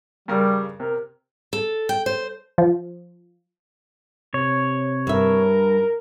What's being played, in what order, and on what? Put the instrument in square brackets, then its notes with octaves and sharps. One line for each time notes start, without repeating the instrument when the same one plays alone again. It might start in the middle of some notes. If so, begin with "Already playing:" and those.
[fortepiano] G2 C#3 A#4 [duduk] G3
[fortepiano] C3 [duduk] A#4
[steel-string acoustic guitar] A4
G5
C5
[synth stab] F3
[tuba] C3 [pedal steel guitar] C#5
[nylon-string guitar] G2 E5 [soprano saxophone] A#4